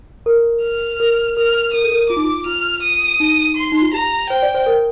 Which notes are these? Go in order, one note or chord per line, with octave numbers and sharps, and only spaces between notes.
A#4
F6
A#4
A#4 F6
A#4 D#6
A4
A#4
F4 D6
D#4
F4
F4 F6
D#6
D#4
C6
D#4
F4
G4 A#5
C5 G5
D5
C5
A#4